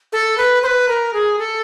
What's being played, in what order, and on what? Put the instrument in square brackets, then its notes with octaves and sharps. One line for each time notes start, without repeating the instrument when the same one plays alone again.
[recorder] A4
B4
C5
B4
A#4
G#4
A4